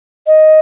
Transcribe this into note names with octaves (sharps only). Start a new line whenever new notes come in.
D#5